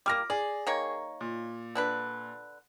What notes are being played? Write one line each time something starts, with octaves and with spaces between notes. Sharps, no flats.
G3 A#3 D6 F6 A#6
G#4 D5
D#3 A#3 C#5
A#2
D3 D4 B4